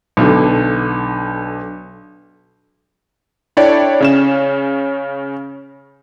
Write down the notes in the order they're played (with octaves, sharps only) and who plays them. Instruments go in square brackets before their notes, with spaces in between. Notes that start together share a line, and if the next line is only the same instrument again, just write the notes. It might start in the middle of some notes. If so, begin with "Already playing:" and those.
[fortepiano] B1 D3
[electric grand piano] D4 E4 A4 C#5 D5 G5
C#3 C#4 E7